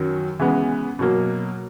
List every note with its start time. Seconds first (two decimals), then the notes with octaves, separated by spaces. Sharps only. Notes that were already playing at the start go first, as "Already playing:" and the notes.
Already playing: F#2 D#3 F#3
0.39 C#3 E3 G#3 B3
0.99 B2 F#3 A#3